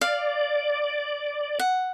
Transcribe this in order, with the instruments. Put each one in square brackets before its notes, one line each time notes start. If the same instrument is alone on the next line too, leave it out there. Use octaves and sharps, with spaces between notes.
[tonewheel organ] D5 [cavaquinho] F5
[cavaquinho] F#5